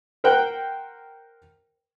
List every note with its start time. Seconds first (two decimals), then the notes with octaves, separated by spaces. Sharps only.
0.24 A#4 C5 F#5 G5 F#6